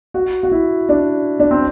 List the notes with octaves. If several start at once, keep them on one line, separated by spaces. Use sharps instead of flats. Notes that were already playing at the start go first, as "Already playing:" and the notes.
F#4
F#4
E4
D4
D4
C4